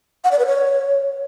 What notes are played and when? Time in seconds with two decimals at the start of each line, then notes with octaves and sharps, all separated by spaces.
0.24 F#5
0.31 D5
0.39 B4
0.46 C#5